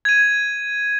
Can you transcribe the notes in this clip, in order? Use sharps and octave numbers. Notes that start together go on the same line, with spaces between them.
G#6 D#7